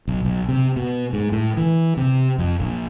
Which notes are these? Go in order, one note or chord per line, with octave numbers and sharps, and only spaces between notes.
B1
B1
C3
B2
G#2
A2
E3
C3
F2
A#1